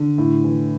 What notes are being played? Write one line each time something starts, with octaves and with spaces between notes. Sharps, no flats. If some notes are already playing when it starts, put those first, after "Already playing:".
Already playing: D3
A2
E3